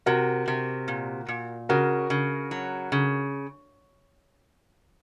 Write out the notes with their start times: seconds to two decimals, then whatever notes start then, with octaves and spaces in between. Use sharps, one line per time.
0.06 C3 F#4 A#4
0.48 C3
0.88 A#2
1.28 A#2
1.69 C#3 F#4 A#4
2.10 C#3
2.51 F#3
2.92 C#3